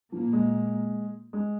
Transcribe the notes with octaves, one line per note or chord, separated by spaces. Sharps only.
A#2 F3 A#3
G#3
G#3